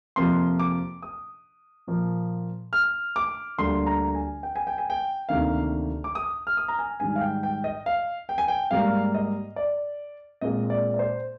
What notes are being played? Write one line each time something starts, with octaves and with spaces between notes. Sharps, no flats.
F2 C3 F3 A#3 C6
D6
D#6
A#2 F3 A#3
F6
D6
D2 D3 G3 A#3 C6
A#5
G#5
G5
G#5
G5
G#5
G5
D2 C3 D#3 A#3 F5
D6
D#6
F6
D#6
A#5
G#5
G#2 D#3 G3 G#5
F5
G5
G5
D#5
F5
G5
G#5
G5
G#2 G3 A#3 F5
D#5
D5
A#2 G#3 C4 D#5
D5
D5
C5